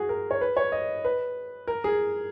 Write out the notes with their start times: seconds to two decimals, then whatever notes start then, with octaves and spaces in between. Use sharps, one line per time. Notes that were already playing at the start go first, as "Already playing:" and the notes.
Already playing: F#4 G#4
0.09 A#4
0.31 C#5
0.41 B4
0.57 C#5
0.72 D#5
1.05 B4
1.67 A#4
1.84 G#4